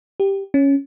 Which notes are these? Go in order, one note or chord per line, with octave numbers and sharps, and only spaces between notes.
G4
C#4